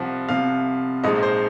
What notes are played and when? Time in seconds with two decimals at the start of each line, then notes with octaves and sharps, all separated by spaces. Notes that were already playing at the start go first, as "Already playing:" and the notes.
Already playing: C2 C3 F3 F#5
0.29 C2 C3 F3 F5
1.04 A#1 G#2 F3 G#3 D#5
1.23 C5